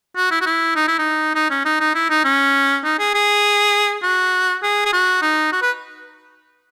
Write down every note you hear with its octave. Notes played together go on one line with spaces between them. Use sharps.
F#4
E4
F#4
E4
D#4
E4
D#4
D#4
C#4
D#4
D#4
E4
D#4
C#4
D#4
G#4
G#4
F#4
G#4
G#4
F#4
D#4
F#4
B4